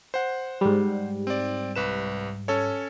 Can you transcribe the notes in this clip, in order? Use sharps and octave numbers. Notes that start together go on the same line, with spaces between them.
C5 F#5
G#2 G3
C4 D5
C2 B4 E7
C#4 A4 C#5